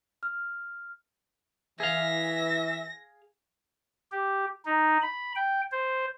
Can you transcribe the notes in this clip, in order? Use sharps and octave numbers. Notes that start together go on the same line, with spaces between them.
F6
E3 G#4 E5 F5 A#6
G4
D#4
B5
G5
C5